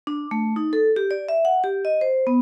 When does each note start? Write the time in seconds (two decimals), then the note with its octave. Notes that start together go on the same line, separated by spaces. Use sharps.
0.07 D4
0.31 A3
0.56 D#4
0.73 A4
0.96 G4
1.11 D5
1.29 E5
1.45 F#5
1.64 G4
1.85 D#5
2.01 C5
2.27 B3